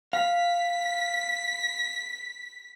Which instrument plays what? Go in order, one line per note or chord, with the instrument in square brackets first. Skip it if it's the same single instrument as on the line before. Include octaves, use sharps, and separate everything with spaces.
[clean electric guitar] F5 [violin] B6